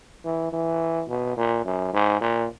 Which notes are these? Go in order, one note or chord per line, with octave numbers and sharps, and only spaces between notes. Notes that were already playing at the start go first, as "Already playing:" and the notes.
E3
E3
B2
A#2
F#2
G#2
A#2